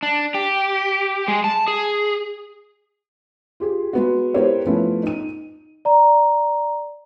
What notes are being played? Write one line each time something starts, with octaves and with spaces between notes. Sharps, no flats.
D4
G4
G#3
A5
G#4
F4 G4 G#4
G#3 B3 F#4
B3 E4 G4 A#4 C5 C#5
F3 A3 B3 C#4 E4
D#4 D#7
D5 A#5